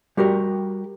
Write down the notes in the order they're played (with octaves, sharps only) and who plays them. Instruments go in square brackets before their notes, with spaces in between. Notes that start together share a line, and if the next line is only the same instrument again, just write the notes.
[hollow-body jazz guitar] G3 F#4 G4 A#4